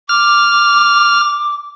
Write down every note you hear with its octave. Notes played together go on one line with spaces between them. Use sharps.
D6 F6